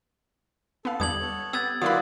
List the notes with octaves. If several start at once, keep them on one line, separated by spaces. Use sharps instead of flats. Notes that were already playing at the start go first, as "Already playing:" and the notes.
B3 A4 F5
E2 D3 G3 D#6 G#6 F#7
B3 A4 C#5
B3 G4 E6 G#6 A6
F#3 A#3 E4 F4 B4 D5 B5 D#6